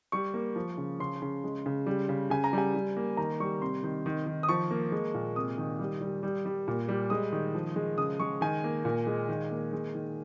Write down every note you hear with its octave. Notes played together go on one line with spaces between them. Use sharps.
G3 C#6
A#3
F3
C#3
C#3 C6
C#3
G#3
C#3
G3
C#3
C#3 G#5
A#5
G3 G#5
G3
A#3
D#3 A#5
G3 C#6
C3 C6
D#3
D#3
D#3
D#6
F3 C#6
A#3
G#3
A#2
C3 D#6
D#3
G3
G3
G3
G3
A#2
G3
G#3 D#6
D#3
F3
G#3
C#3 D#6
G#3 C#6
D#3 G#5
A#3
A#2
G#3
D#3
A#3
G#3
D#3